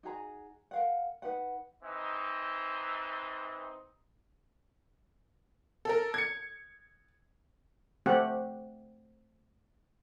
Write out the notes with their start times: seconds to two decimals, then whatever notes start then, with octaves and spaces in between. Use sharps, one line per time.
0.03 D#4 F#4 G#4 A#5
0.71 A#4 F5 F#5
1.22 D#4 B4 F#5
1.83 E3 C4 D#4
5.85 A4 A#4
6.14 G#6 C#7
8.06 A3 C4 G4 F#5